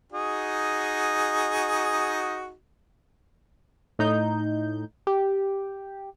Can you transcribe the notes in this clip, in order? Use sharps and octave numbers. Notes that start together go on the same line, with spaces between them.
D#4 F#4 G#4
A2 D#4 G6
G4